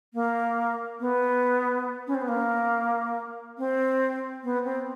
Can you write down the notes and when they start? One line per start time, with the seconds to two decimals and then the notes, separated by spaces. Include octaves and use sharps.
0.14 A#3
1.00 B3
2.07 C#4
2.15 C4
2.22 B3
2.28 A#3
3.58 C4
4.43 B3
4.65 C4